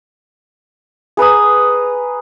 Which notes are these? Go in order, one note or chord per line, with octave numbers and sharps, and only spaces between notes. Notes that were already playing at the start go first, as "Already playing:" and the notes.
G#4 B4 A#5 D#6